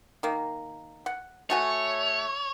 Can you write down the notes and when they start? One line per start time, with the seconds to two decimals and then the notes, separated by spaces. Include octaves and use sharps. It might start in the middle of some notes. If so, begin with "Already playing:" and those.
0.23 D#3 A#3
1.06 F#5
1.50 A3 F#4 C#5 G#5